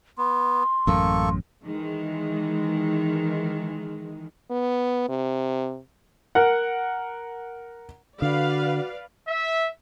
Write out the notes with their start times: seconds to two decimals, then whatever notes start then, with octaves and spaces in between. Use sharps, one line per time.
0.18 B3 C6
0.87 A1 F#2 A#3 A4 C#6
1.65 D#3 E3 G#3
4.50 B3
5.09 C3
6.35 A#4 F#5
8.22 D3 F#4 B4 D5 F5
9.28 E5